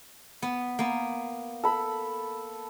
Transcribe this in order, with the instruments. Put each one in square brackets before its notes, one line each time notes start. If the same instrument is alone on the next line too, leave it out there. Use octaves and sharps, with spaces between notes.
[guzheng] B3
A#3 B3
[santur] A4 B5